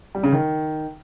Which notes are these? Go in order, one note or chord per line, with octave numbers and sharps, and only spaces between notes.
G3
C#3
D#3